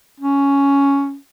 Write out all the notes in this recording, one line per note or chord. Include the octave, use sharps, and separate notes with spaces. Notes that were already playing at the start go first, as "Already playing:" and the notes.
C#4